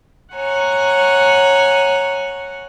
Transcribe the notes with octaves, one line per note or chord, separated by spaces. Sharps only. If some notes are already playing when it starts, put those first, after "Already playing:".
C#5 F#5 G#5 A#5